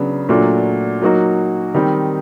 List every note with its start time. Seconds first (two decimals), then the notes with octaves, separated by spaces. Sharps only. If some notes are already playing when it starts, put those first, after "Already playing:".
Already playing: C#3 F#3 B3 D4
0.29 A#2 F#3 A3 D4 F#4
1.02 F#3 A#3 D#4 F#4
1.74 D#3 G3 C4 D#4